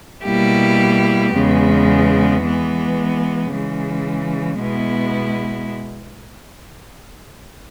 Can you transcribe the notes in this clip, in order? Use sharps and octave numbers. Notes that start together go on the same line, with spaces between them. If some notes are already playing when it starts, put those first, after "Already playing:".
B2 G3 A#3 E4 G4
E2 C#3 G#3 B3
E3 G#3 B3
C#3 E3 G#3
B2 G#3 B3 E4